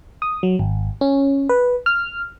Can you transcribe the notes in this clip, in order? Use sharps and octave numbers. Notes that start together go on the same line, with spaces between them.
D#6
F#3
G#1
C#4
B4
F6